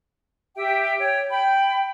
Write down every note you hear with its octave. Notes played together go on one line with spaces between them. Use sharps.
G4 E5 G5
C#5 G5
G5 B5